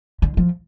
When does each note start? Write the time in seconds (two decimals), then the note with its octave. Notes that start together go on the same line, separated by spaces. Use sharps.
0.22 D3
0.37 F3